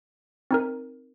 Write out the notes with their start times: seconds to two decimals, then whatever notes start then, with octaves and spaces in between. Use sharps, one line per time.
0.51 C4 D#4 A#4